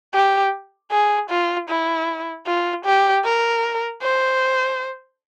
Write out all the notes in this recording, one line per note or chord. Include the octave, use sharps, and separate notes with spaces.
G4
G#4
F4
E4
F4
G4
A#4
C5